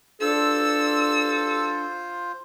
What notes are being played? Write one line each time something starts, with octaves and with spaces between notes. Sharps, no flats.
D4 F4 A4 C5 E6